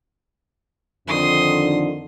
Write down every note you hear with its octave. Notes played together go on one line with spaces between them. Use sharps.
F2 D3 D#3 C6 D#6